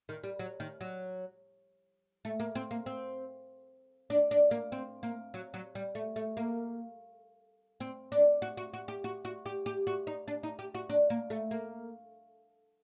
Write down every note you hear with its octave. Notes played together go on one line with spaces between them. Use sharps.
D#3
G3
F#3
D#3
F#3
A3
A#3
C4
A#3
C4
D4
D4
A#3
C4
A#3
F#3
F#3
G3
A3
A3
A#3
C4
D4
F#4
F#4
F#4
G4
F#4
F#4
G4
G4
F#4
D#4
D4
D#4
G4
F#4
D4
A#3
A3
A#3